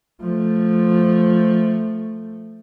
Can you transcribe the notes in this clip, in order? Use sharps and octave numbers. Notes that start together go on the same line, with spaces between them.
F3 A3